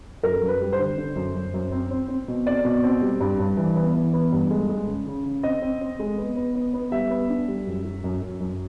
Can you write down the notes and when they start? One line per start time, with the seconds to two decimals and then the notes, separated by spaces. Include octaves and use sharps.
0.23 F#2 A#4
0.42 F#2
0.48 B4
0.61 G3
0.72 C5
0.79 D3
0.97 D3
1.16 F#2
1.35 F#2
1.54 F#2
1.72 C4
1.91 C4
2.08 C4
2.28 B2
2.46 C4 D5
2.65 B2
2.84 C4
3.01 G3
3.20 G2
3.39 G2
3.57 E3
3.76 B3
3.95 E3
4.13 B3
4.32 G2
4.50 G#3
4.69 G#3
4.87 C#3
5.06 C#3
5.25 C#3
5.43 C4 D#5
5.62 C4
5.81 C4
5.99 G#3
6.18 B3
6.36 B3
6.55 B3
6.74 B3
6.92 G3 E5
7.10 B3
7.30 D4
7.48 G3
7.67 F#2
7.85 F#3
8.04 F#2
8.22 F#2
8.40 F#2